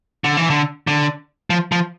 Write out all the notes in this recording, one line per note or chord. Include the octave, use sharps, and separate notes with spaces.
D3
E3
D3
D3
F3
F3